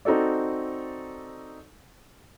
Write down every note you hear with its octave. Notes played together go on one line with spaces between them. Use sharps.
C4 D#4 F#4 A4 D5